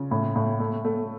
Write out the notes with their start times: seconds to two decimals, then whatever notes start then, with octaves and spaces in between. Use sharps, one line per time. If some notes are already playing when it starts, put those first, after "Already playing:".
Already playing: C#3 F4
0.11 A2
0.36 A2
0.59 A3
0.85 A3